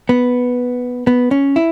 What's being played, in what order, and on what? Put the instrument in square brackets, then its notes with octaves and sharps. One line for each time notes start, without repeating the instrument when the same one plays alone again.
[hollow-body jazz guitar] B3
B3
C#4
E4